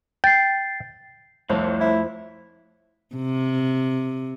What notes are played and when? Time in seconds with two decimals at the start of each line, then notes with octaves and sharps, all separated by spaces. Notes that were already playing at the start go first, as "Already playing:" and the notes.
0.24 G5 A6 C7
1.49 C2 F2 A3 C5 C#5 F5 A5
1.80 E4
3.16 C3